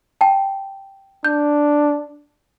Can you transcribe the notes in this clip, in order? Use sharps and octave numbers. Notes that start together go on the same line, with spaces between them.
G5 A5
D4 G6